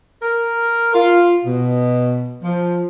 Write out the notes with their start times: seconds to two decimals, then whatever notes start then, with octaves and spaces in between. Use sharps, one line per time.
0.23 A#4
0.94 F4
1.45 B2
2.42 F3